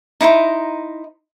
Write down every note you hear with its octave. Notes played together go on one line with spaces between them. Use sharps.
D#4 E4 C5 A#5